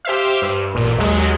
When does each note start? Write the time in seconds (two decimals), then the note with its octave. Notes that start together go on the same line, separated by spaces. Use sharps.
0.05 G4 C5 E5 F5
0.42 G2
0.74 A1 A#2
0.98 D#2 F#3 G#3